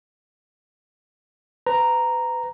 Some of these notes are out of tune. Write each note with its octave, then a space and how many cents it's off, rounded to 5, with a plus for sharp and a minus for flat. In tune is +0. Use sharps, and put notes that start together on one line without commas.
B4 +30 A#5 +0